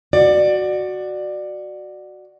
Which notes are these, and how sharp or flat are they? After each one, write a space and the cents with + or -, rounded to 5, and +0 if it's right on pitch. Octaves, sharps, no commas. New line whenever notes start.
F#4 +0 D5 +20